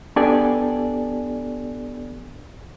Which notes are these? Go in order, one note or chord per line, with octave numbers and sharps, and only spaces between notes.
B3 D4 G4 A4 D5 G#5